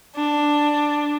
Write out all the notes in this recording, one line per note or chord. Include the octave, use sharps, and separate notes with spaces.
D4